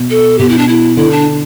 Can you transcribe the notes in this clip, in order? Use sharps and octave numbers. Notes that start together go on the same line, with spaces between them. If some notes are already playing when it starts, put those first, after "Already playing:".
Already playing: B2
A4
B2 G4
E4
D4
E4
D3 E4
D4